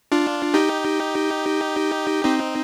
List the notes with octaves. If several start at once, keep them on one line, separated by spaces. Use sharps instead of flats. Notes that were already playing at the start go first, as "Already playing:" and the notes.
D4 F4
D#4 G4
C4 D#4